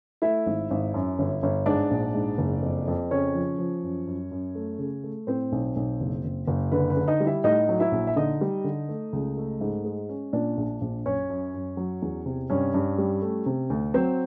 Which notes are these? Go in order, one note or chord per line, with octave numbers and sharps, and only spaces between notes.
A3 E4 E5
G#1
G#1
F#2
G1
G1
G#2 D4 D5
A#1
G#2
F#1
F2
F2
C#3 C#4 C#5
F3
F3
F#2
F#2
F#2
A3
C#3
A3
A2 C4 C5
B1
B1
F#1
F#1
F#1
D3 B4
B4
D3
D#4 D#5
G3
E4 E5
A2 D#4 D#5
F#3
E4 E5
A#1
E5
D3 D#4 D#5
G3
D3
A3
C#2
A3
G#2
G#3
C#4
A#2 D4 D5
A#1
A#1
F#2 C#4 C#5
F#2
F#2
F#3
E2
C3
G2 C#4 C#5
G2
G3
A3
C3
D2
F#3 C4 C5